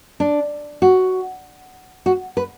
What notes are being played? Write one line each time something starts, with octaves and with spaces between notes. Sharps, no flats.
D4
F#4
F#4
B4